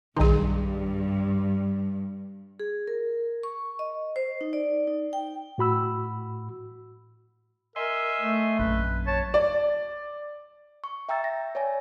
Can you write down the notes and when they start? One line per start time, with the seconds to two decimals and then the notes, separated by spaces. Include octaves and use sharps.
0.17 B1 G2 D#3 G#3 D#4 G#4
2.60 G#4
2.88 A#4
3.43 C#6
3.79 D#5
4.16 C5
4.41 D#4
4.53 D5
4.87 D#4
5.13 G5
5.58 A2 F#4 B5 E6
7.76 A#4 D#5 E5 G#5 C6
8.21 A3
8.59 A#1 F#2 C#3 B4
9.07 C#5 A5
9.34 D5
10.84 C#6
11.09 E5 G5 A#5 E6 A6
11.24 A#6
11.55 C#5 D5 G#5